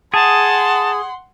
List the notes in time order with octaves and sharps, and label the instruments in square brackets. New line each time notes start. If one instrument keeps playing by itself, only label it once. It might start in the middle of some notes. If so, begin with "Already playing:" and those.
[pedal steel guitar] G#4 [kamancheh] F#5 C6 [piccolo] A5